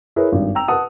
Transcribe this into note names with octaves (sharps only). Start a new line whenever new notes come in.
E4 G#4 A#4 B4 C#5
G#1 G2
G5 A#5 E6 F7
B4 F#5 A5 D#6